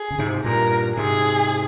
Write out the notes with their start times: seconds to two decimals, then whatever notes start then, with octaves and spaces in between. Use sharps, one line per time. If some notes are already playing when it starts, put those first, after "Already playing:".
Already playing: G#4
0.11 C#3
0.19 G#2 C3
0.44 G2 A#2 A#4
0.97 G#2 C3 G#4